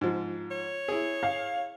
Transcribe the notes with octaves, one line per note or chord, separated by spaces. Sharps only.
G#2 F3
C#5
E4 G#4
F5